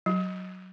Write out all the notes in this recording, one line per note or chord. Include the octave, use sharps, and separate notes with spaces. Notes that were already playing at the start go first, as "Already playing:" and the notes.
F#3